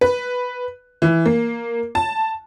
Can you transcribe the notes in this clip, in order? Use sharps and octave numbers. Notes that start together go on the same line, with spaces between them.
B4
E3
A#3
A5